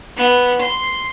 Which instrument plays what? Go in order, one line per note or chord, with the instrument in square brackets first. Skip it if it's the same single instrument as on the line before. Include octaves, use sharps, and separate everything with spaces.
[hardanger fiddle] B3
C6